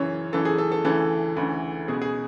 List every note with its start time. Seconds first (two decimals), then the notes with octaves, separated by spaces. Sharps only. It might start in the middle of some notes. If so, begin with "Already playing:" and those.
Already playing: F#2 C#3 E3 C#5
0.32 F#2 C#3 E3 A4
0.45 G#4
0.58 A4
0.72 A4
0.85 D2 C#3 E3 A4
1.37 D2 C#3 E3
1.88 C#2 B2 G#4
2.02 G#4